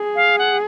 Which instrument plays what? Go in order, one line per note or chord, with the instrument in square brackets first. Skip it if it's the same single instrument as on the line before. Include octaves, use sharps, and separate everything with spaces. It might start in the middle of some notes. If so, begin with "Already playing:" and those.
Already playing: [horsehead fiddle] G#4
[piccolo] F5
F#5